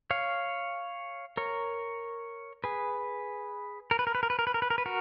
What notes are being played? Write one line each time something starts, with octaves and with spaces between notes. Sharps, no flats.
C#5 F5
A#4 C#5
G#4 B4
A#4
B4
A#4
B4
A#4
B4
A#4
B4
A#4
B4
A#4
B4
F#4 A#4